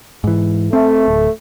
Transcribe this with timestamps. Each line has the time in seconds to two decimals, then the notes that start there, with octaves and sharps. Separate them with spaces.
0.24 G#2 E3
0.73 A3 C4
1.08 D1